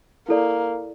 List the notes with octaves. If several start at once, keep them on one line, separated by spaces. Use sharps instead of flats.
A#3 E4 A4 D5